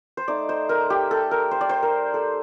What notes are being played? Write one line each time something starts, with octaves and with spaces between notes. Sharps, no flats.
C5
A3 D#4 D5
C5
A#4
G4
A4
A#4
C5
D5
C5
A#4
A4